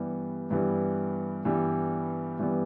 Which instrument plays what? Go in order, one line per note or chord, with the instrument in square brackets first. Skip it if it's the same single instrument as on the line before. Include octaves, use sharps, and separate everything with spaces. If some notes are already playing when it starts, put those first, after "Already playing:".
Already playing: [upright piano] G2 E3 G3 B3
G2 E3 G3 B3
G2 E3 G3 B3
G2 E3 G3 B3